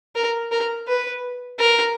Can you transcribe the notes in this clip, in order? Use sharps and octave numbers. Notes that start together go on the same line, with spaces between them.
A#4
A#4
B4
A#4